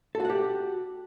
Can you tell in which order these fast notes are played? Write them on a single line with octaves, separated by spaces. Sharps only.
A4 F#4 F#5 G4